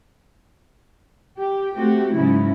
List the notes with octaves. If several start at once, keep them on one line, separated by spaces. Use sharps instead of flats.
G4
A3 C4 F#4 G4
G#2 C#3 F#3 C#4 E4